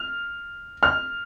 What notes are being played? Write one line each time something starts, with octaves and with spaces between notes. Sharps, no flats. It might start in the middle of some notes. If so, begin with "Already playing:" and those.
Already playing: F6
F6